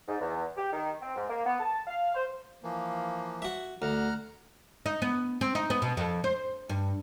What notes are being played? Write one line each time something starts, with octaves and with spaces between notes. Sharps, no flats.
G#2
E2
G4
D#3
C4
G#2
A#3
B3
A5
F5
C5
E3 F3 A#3
F#4 E5
D2 F#5 A#5 F6
D#4
B3
C4
D#4
B3
B2
F2
C5
G2